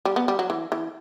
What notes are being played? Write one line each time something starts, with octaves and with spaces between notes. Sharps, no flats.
G3
B3
G3
F#3
E3
E3